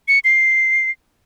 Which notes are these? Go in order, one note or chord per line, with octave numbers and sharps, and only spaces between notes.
C#7
C7